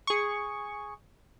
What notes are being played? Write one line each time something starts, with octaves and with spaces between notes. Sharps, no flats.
G#4 C#6